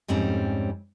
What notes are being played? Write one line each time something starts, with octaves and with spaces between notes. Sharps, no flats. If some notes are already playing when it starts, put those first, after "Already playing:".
F2 G#2 G3 C4 C#4